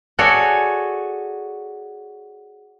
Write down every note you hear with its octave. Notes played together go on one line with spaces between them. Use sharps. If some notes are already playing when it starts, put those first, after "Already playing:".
F#4 G#4 A4 C#5 D5